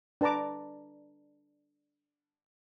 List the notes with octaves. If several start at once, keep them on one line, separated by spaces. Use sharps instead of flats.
D4 B4 A5 A#5 D6